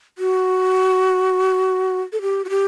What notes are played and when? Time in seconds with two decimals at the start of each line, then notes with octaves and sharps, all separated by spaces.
0.18 F#4
2.12 A4
2.22 G4
2.44 F#4
2.50 G4